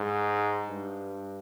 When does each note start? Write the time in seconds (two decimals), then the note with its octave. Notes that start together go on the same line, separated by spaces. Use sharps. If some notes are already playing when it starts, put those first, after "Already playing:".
Already playing: G#2
0.69 G2